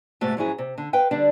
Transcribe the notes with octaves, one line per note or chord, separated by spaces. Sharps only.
G#2 C3 A3 F#4
G#2 F3 F#3 C#4 E4 G#4
C3
D3
B4 F5 G5
D3 G3 D4